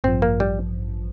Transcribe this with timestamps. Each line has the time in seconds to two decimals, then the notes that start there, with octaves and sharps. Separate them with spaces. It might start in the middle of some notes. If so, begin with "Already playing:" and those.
0.04 A1 G2 F3 C4
0.22 A#3
0.40 G3